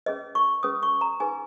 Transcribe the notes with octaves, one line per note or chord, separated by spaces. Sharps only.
C#4 G#4 B4 D#5
C#6
C#4 G#4 B4 D#6
C#6
A#5
D#4 G#4 B4 G#5